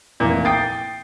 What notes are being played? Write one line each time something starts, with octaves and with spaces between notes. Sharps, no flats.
F1 A#2 E3
G5 D#6 G6 A6 C7